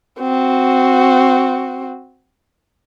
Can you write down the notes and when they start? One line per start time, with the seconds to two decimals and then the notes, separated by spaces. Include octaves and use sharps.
0.20 C4 F#4